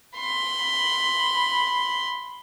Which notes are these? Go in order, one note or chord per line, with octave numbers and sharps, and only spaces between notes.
B5 C6